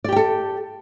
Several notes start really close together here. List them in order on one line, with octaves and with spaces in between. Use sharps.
D5 G4 G5 A4